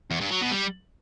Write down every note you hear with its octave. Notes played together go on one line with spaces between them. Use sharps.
E2
G2
F#3
B2
G3